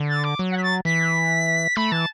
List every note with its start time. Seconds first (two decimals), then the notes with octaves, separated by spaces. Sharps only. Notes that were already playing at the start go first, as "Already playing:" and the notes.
Already playing: D3
0.08 A6
0.24 D6
0.39 F#3
0.51 F#5
0.57 B6
0.63 A6
0.85 E3 B6
1.76 A3 B5
1.91 E3 A5